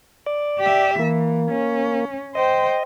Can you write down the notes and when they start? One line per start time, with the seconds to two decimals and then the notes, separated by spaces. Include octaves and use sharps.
0.26 D5
0.59 G4 E5
0.99 E3 A#3
1.51 C#4
2.35 C5 D#5 G5